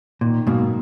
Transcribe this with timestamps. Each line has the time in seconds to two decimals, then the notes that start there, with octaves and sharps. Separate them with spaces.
0.21 A#2 D#3
0.47 G#2 B2 F#3 A#3